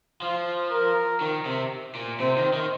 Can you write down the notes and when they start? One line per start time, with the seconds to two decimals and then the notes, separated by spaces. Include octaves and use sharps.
0.22 F3 F4
0.72 A#4
1.21 D#3
1.45 C3
1.95 A#2
2.20 C3 C5
2.37 D#3
2.54 D#3